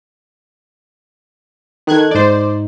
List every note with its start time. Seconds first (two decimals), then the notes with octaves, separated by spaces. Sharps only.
1.87 D#3 D#4 A4 F#6 G#6
2.11 G#2 D#4 C5 D5